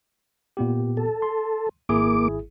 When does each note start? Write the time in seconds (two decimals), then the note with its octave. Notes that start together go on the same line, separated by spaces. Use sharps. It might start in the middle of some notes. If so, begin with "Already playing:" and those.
0.57 A#2 B3 G4
0.97 A4
1.22 C6
1.89 G#1 A#3 E4 G#4 D6